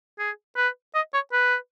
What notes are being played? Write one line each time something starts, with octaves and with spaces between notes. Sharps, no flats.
G#4
B4
D#5
C#5
B4